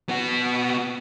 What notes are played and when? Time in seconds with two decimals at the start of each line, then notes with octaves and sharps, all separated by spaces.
0.09 B3 F#4